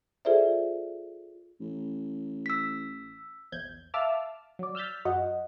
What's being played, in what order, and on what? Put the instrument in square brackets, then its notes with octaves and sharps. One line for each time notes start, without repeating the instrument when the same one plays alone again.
[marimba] F4 G#4 A4 C5 D5 E5
[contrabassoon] A1
[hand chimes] E6 B6
[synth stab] A#1 E2 G6 G#6
E5 F5 A5 D6 E6 F6
F#3 D5
E6 F6 G6 A6 B6
F#2 F#3 D#5 F#5